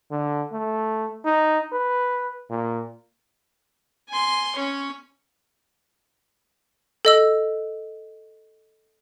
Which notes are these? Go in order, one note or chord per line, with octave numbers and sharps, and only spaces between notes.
D3
A3
D#4
B4
A#2
G#5 C6
C#4 C#5
A4 D#5 E6